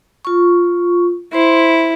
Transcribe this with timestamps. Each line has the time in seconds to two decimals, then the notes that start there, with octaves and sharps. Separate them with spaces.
0.25 F4 C#6
1.33 E4 C5 C6